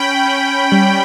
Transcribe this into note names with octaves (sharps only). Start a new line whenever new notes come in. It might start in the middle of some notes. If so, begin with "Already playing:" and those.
Already playing: C#4 G5 B5
C#4
G3